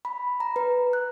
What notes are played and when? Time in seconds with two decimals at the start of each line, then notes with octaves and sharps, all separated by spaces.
0.05 B5
0.40 A#5
0.56 B4
0.93 F#6